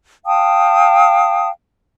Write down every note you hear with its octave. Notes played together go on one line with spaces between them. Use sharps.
F5 G5 A5 D#6